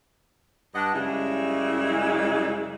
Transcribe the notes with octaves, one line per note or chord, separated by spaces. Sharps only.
G2 D4 D#5 F#5
F#2 C#3 G3 G#3 C#4 E4